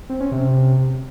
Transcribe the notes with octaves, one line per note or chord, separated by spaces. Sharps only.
C4
C#4
C3